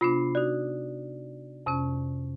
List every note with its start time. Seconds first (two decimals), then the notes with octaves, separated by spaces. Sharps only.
0.01 C3 B3 D4 F4 B5 C7
0.35 D#4 F#4 D5
1.66 F2 C3 C#4